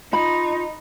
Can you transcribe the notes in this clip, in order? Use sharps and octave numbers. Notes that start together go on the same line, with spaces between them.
D#4 F4 B5